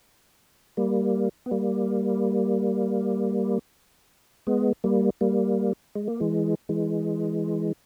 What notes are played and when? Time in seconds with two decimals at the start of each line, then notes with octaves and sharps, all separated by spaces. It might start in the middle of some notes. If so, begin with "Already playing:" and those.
0.77 G3 A#3
1.46 B3
1.51 G3 A#3
4.47 G#3 B3
4.84 G3 A#3
5.21 G3 A#3
5.95 G#3
6.08 A#3
6.20 E3 G#3
6.69 E3 G#3